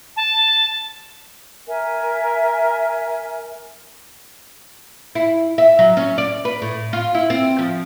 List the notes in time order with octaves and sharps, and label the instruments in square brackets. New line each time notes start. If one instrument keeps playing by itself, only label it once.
[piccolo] A5
[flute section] A#4 E5 G#5
[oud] E4
E5
F#3
C#4
D5
B4
A2
F4
E4
C4
F3